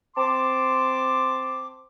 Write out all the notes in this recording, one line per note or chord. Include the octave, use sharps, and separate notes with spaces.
C4 A5 C6 D6